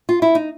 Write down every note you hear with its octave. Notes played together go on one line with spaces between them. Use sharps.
F4
E4
D#4